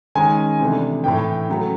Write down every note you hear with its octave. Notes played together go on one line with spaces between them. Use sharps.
D#3 G#3 C#4 G#5
C3 E3 A3 D4
A2 E3 A3 G5
C#3 F#3 A3